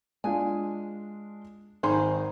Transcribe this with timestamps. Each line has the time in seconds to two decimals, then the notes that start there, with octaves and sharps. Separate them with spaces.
0.24 G#3 D4 F4 G#5
1.83 G#1 D#3 G#4 C5 C6